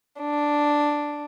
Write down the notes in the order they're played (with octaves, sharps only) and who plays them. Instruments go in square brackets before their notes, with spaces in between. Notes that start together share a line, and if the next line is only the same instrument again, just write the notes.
[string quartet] D4